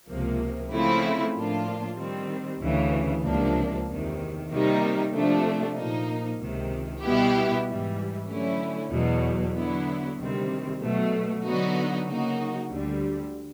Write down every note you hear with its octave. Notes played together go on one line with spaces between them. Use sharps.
C#2 C3 F3 A#3
C#3 F3 A3 C4 E4
A2 F3 A#3 D4 F4
D#3 G3 C4
D2 C#3 E3
C#2 C3 F3 A#3 D4
E2 C3 D#3
C3 D#3 G3 A#3 D#4
C3 F3 A3 D4
A#2 F3 A#3 D#4
C#2 C3 D#3
B2 G3 B3 E4 G4
G#2 E3 G3
D3 F#3 A3 C#4 E4
E2 B2 F#3
D3 F#3 B3 E4
D2 C3 D#3 G3 C4
B2 F#3 A3
D3 F#3 B3 D#4 F#4
C#3 F#3 A#3 D#4 F#4
D2 D3 G3